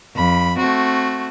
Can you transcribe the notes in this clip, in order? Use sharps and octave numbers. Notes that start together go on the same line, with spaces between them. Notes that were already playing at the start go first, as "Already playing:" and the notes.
F2 B5
A3 C4 F#4